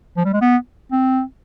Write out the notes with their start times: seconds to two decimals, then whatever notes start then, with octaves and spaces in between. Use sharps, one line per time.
0.17 F3
0.25 G3
0.33 G#3
0.41 B3
0.92 C4